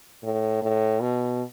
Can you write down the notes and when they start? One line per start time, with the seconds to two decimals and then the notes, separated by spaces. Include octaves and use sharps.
0.23 A2
0.62 A2
1.01 B2